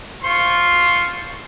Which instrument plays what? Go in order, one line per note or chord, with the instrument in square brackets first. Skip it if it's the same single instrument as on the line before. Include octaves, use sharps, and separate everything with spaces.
[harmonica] F4 C5 C#6